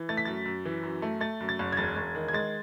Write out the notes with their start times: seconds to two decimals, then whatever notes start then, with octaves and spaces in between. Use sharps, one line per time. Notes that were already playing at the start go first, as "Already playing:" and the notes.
Already playing: E3
0.09 A3 A6
0.17 B6
0.25 F#2 A6
0.45 F#2
0.65 E3
0.83 F#2
1.02 A3
1.21 A3 A6
1.40 F#2
1.49 A6
1.59 F#1
1.73 G#6
1.77 E1 A6
1.97 E1
2.15 D#3
2.28 G#6
2.33 G#3 A6